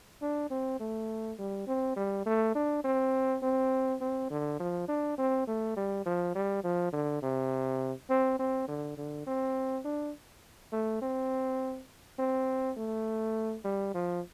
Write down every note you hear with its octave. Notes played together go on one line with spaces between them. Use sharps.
D4
C4
A3
G3
C4
G3
A3
D4
C4
C4
C4
D3
F3
D4
C4
A3
G3
F3
G3
F3
D3
C3
C4
C4
D3
D3
C4
D4
A3
C4
C4
A3
G3
F3